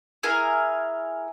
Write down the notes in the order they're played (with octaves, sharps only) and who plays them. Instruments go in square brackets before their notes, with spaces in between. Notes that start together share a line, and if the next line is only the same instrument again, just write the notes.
[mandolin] E4 G#4 A#4 G#5